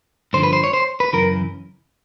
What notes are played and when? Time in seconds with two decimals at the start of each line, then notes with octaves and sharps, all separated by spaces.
0.33 G2 D3 F3 C5
0.43 B4
0.53 C5
0.64 C#5
0.73 C5
1.00 B4
1.13 F#2 C#3 E3 A#4